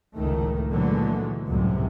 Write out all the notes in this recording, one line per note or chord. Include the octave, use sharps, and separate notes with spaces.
F1 C#2 A2 D#3 A3
A#2 D3 E3 F#3 G#3 A3
C#2 F#2 A2 C3 G3